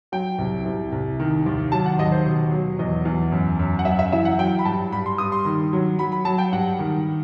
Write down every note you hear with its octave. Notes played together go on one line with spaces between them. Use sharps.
F#3 G5
C2
C2
C2
D#3
D#2
F#3 A5
F#5
D#2 D#5
C5
B2
F#3
E2 D#5
E2
F#2
F#2
F#5
F#2 E5
E5
E3 E5
F#5
F#3 G5
B5
G2 A5
G2 B5
C6
G2 D#6
C6
D#3
F#3
F#3 B5
B5
F#3 A5
G5
G2 F#5
D#3